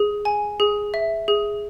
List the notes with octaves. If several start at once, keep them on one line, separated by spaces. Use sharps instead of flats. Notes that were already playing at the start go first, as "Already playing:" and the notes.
Already playing: G#4
G#5
G#4
E5
G#4